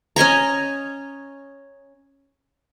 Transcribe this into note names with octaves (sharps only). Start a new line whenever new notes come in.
C#4 D#5 G#5 A#5